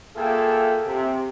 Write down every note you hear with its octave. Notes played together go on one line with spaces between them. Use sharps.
A#3 F4 G#4 A4 E5 G5
C3